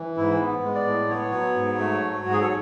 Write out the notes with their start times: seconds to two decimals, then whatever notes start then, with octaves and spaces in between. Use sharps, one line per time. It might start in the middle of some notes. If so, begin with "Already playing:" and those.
Already playing: E3
0.17 G#2 E4
0.41 B3
0.63 G#3
0.74 D5
0.86 A2
1.09 B3 C#5
1.32 F#3
1.55 G#2
1.78 A3
2.01 F#3
2.25 G#2 F#4
2.32 G#4
2.41 A4